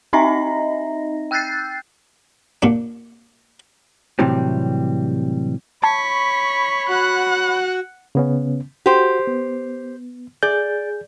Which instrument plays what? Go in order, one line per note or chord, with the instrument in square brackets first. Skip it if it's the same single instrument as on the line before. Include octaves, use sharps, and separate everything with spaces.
[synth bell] C4 D#4 D#5 E5 A#5 A#6
G5 E6 F#6 G6 A6 C7
[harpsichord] A#2 D4
[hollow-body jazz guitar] A2 C3 E3 F#3 G3 C4
[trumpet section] C#5 B5 [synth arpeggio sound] A5 G#6 [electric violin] C#6 B6
[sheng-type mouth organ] F#4 [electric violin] F#5 F#6
[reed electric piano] C#3 B3 C#4
[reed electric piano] F#4 [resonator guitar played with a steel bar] G4 C5
[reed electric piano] B3
[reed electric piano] G#4 G6 [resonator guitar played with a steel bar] D5